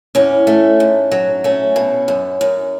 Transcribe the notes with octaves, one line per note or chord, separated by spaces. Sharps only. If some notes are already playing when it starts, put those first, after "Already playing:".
E2 C#4
A3
G#2
F#3
A3 C#4
B2
F#2
F#2